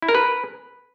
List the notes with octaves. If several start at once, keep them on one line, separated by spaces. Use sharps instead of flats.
E4
A#4
B4